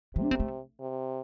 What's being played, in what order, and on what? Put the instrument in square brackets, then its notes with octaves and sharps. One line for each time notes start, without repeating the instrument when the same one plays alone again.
[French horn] C3 [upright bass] E3
[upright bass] D4
C4
A3
[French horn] C3